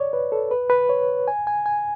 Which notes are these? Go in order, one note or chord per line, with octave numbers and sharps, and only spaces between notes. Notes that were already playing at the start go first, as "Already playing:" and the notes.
Already playing: C#5 D5
B4
A4
B4
B4
C#5
G#5
G#5
G#5